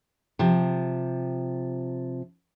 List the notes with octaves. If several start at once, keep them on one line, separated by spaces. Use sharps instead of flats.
C3 F3